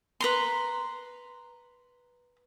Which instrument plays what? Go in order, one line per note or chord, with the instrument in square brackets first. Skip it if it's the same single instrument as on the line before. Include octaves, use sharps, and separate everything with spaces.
[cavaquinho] B4 A#5 C6